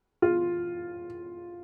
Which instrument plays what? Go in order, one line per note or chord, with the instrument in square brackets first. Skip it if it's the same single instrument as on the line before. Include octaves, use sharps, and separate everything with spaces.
[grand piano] F4